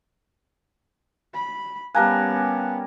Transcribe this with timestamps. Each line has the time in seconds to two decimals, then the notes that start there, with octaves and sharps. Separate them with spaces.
1.34 B5
1.95 G3 B3 C#4 A#4 F5 G#5 A5 F#6